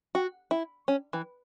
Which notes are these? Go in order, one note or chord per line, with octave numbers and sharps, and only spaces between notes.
F#4
E4
C#4
E3